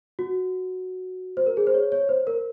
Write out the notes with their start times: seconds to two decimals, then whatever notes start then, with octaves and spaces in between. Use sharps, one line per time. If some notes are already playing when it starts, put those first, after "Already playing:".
0.19 F#4
1.37 C5
1.46 A#4
1.57 G#4
1.67 C5
1.74 C#5
1.92 C#5
2.09 C5
2.27 A#4